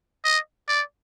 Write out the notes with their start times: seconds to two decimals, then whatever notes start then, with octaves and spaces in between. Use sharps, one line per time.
0.25 D#5
0.68 D5